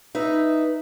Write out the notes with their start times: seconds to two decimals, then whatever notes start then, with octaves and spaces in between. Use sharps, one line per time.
0.15 D#4 B4 E5